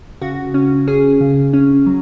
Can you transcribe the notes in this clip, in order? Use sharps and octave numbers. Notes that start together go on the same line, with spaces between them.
C#3 F#4
C#4
C#4 G#4
C#3
C#4
F#3